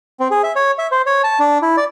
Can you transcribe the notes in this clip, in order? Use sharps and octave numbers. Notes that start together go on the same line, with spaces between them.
C4
G#4
E5
C#5
E5
C5
C#5
A5
D4
E4
D5